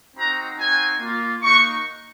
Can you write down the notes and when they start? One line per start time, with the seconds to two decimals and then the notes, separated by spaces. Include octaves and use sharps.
0.16 C4 D#4 F#4 A#5
0.58 C4 D#4 F#4 G#5
1.00 A#3 F4
1.42 A#3 D#4 F#4 C#6